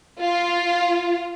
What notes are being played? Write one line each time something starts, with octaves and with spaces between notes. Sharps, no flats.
F4